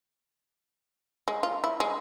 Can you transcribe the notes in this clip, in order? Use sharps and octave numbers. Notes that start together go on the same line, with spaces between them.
G#3
F4
E4
G#3